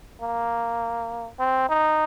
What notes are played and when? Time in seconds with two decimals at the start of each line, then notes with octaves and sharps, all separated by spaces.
0.21 A#3
1.39 C4
1.69 D#4